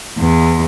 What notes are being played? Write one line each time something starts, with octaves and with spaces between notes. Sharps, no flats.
E2